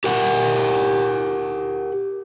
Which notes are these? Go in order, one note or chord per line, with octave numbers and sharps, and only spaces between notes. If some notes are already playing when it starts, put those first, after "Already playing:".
G4 A#4 F#5